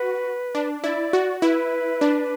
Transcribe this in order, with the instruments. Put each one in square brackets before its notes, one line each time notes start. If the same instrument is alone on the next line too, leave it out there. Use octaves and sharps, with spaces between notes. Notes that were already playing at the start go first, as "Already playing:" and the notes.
Already playing: [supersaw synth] F#4 [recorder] B4
[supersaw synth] D4
[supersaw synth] E4 [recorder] D5
[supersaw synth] F#4
[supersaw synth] E4 [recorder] B4
[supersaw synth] D4